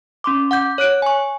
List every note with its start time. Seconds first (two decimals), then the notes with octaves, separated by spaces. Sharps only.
0.24 C#4 C6 D6
0.51 F#5 D6 G6
0.78 C#5 F#6 D7
1.02 G#5 C#6